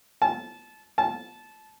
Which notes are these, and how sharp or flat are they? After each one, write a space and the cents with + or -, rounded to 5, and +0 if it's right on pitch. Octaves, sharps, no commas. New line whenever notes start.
A5 -25
A5 -20